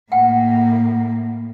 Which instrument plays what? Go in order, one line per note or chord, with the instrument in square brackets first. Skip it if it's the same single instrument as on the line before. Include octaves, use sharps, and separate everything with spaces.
[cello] A2 A#3 [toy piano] F#5 G5